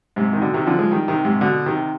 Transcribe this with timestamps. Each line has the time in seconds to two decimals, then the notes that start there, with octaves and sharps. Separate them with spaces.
0.16 G#2 C3
0.33 D#3
0.41 B2 D3
0.54 C3 D#3
0.67 D3 F3
0.79 F3 G#3
0.91 D#3 G3
1.08 C3 D#3
1.25 G#2 C3
1.41 B2 D3
1.66 C3 D#3